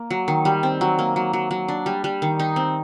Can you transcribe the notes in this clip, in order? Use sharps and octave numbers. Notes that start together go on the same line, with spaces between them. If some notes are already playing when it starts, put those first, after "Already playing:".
Already playing: A#3
F#3
D#3
G3
C4
F#3
A#3
F#3
F#3
F#3
D4
G3
G3
D#3
D#4
C4